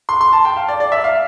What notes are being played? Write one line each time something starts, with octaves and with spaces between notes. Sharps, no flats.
C6
C6
A5
G5
F5
D5
D5
E5
F5